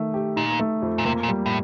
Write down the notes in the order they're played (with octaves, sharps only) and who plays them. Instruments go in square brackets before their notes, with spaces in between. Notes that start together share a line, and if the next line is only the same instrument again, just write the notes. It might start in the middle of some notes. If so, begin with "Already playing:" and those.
Already playing: [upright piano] D#3 A3
G4
[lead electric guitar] A#2 [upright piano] D#4
[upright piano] A3
F2
[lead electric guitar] A#2
[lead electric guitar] C3 [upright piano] A#3
[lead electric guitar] A#2
[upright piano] G3
[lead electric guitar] A2